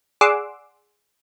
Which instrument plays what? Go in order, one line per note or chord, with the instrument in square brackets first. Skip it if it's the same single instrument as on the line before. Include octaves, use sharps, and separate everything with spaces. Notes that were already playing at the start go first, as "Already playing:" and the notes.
[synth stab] G#4 D5 F#5 C6 D6 E6